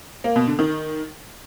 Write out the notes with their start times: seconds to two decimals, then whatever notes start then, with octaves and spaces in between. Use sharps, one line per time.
0.24 A#3
0.36 B2
0.47 D3
0.59 D#3